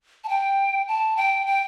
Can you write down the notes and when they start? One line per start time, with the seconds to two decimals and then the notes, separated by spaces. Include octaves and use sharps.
0.24 A5
0.29 G5
0.88 A5
1.17 G5
1.46 G5